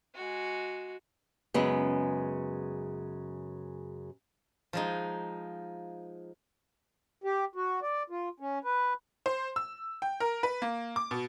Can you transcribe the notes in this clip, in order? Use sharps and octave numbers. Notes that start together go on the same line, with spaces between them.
G#3 F#4
F#2 C#3 G#3 B3
F3 G#3 D#4
G4
F#4
D5
F4
C#4
B4
C5
E6
G5
A#4
B4
A#3
D6
B2